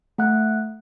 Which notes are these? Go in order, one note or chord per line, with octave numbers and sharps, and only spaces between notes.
A3 F#5 F#6